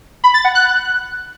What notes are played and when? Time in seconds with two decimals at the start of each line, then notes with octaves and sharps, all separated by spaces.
0.24 B5
0.34 A6
0.44 F#5
0.55 F#6